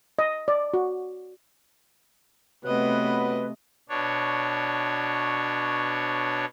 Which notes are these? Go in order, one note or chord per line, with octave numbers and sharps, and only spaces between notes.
D#5
D5
F#4
C3 F#3 A3 B3 B4 D#5
B2 D4 C#5